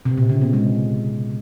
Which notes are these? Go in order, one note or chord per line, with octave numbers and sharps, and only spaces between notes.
C3
A#2
C#3
B3
G#3